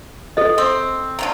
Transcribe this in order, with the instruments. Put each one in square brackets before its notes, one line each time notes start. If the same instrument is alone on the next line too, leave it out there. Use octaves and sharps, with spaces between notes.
[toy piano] A4 D#5
[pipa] C4
D3 D#3 A#3